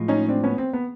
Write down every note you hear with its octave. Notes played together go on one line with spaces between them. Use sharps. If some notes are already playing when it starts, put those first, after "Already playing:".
Already playing: A2 F3 G#3
C#4 D#4
C4 D4
B3 C#4
C4
B3